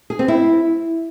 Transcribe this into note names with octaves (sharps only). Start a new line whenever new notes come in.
G#4
C4
E4